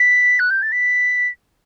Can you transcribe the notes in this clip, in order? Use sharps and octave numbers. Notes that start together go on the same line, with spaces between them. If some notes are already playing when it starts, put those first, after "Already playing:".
Already playing: B6
F#6
G6
A6
B6